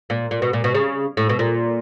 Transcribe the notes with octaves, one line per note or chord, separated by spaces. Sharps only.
A#2
A#2
B2
A#2
B2
C#3
A2
B2
A#2